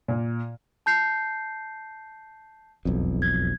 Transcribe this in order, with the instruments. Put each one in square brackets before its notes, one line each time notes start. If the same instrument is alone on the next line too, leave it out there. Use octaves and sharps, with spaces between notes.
[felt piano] A#2
[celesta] A5 G6 C7
[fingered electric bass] E1 B1 F2
[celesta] G#6